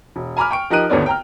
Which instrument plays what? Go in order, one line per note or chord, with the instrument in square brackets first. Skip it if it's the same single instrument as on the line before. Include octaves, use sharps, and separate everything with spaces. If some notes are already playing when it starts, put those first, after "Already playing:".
[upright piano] E1
G#5 A#5 B5 D6 F6
G5 C#6 D7
F3 D#4 G4 A#4 F#6 D#7
G#1 D#2 D3 B3 C#5 D5
G5 A#5 F6